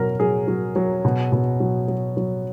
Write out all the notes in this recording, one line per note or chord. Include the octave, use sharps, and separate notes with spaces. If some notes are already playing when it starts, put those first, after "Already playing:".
Already playing: B2 F#3 A#4
F#3 G#4
F#3
F#3
B2
B2
F#3
F#3
F#3